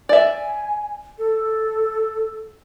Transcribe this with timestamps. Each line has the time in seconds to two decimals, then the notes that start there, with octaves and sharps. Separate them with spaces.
0.09 D5 E5 G#5
1.18 A4